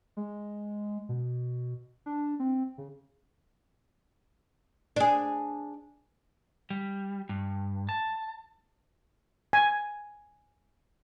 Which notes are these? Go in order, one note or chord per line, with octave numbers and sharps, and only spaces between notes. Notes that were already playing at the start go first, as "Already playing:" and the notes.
G#3
B2
D4
C4
C#3
D4 G#4
G3
G2
A5
G#5